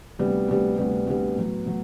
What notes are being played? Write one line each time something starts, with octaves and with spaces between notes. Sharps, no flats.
D2 C3 G3 B3
D2 C3 G3 B3
D2 C3 G3 B3
D2 C3 G3 B3
A2 F#3 B3
A2 F#3 B3